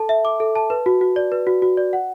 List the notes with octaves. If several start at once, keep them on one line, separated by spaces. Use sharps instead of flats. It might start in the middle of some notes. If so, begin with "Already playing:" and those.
Already playing: A4 A5
E5
D6
A4
A5
B4
F#4
F#4
D5
B4
F#4
F#4
D5
F#5